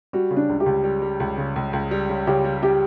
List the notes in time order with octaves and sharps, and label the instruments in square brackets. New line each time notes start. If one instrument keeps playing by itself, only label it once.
[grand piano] G3 [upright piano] F#4
[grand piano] C#3
[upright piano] D4
[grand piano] C#2
[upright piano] G4
[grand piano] C#2
G3
G3
C#2
C#3
C#2
C#2
G3
C#3
[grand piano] C#3 [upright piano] G4
[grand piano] G3
[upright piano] G4